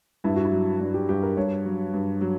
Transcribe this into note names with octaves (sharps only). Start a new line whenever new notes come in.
G2 E4
F#4
E4
F#3
G2 D4
G4
G2 G4
A#4
G2 C#5
F#3
G2
F#3